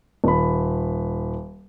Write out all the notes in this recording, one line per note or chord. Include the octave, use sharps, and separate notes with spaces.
D#1 B5